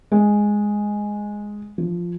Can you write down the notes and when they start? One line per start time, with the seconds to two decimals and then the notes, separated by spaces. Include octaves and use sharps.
0.12 G#3
1.78 F3